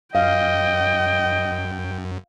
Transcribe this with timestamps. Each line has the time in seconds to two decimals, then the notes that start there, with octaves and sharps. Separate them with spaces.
0.15 F#2 D#5 F5 G5